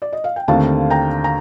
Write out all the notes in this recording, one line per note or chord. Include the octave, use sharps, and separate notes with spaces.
D5
D#5
F5
G5
D#2 D3 A3 C4 F5 A5
G5 A#5
A#5